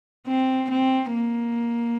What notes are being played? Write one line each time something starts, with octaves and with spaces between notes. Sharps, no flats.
C4
C4
A#3